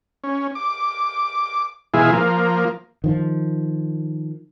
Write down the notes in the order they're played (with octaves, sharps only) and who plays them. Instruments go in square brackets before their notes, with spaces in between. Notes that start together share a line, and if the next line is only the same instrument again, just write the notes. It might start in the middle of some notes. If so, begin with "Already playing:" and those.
[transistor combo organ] C#4
D6
B2 E3 G#3 E4 F4 G#4
F3 A#3
[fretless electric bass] D#3 F3